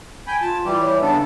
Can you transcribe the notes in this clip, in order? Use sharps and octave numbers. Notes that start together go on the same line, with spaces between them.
G5 G#5 B5
F4 A5
E3 G3 G4
C#5
C#3 B3 D4 A4